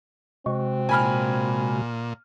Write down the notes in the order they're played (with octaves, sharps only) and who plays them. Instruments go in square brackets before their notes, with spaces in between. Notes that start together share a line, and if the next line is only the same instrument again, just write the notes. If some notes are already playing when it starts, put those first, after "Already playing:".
[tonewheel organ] C3 G#3 F#4 [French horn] C4
[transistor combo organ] A#2 [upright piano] G#5 B5 F6